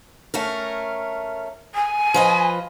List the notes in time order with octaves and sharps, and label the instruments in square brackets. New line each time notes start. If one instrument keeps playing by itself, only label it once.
[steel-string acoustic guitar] A3 C#4 A#4
[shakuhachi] G#5
[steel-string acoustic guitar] F3 B4 D#5